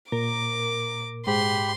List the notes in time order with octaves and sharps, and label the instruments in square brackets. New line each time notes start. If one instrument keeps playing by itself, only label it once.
[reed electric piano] A#2 [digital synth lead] A#4 [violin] D6
[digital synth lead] G#2 [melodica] G4 B5 [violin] C6